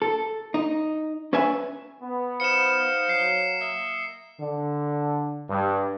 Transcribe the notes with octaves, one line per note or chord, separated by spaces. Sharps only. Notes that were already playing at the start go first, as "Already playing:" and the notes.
A4
D#4
C#4 B4 E5 G#5
B3
D#4 C5 F5 C#7 E7
F#3 C7
A#3 D#5 E5
D3
G2